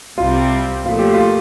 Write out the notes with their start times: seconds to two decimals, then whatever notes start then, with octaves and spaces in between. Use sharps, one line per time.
0.18 C2 C3 G3 C4 F4
0.84 A#2 F3 A3 F4
0.99 G4
1.13 F4